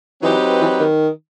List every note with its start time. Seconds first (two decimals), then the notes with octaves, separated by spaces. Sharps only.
0.22 E3 F#3 C4 D#4 G4 B4
0.61 E3
0.79 D#3